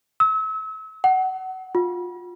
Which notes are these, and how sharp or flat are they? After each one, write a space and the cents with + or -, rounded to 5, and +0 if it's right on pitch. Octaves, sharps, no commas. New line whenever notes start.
E6 -35
F#5 +25
F4 +30